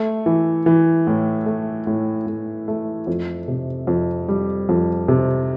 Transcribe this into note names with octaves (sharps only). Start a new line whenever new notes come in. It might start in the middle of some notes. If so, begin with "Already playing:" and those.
Already playing: A3
E3
E3
A2
A3
A2
A2
A3
F2
C3
F2
G3
F2
C3